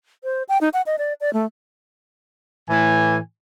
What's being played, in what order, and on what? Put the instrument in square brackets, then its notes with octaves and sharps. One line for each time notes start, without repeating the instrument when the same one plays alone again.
[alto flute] C5
G5
D#4
F#5
D#5
D5
D5
A3
[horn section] A2 E3 G#5